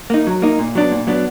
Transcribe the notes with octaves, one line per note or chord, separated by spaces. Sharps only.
A#3 D#4
F#3
A#3 D#4
A#2
F#3 B3 D4
A#2
F#3 B3 D4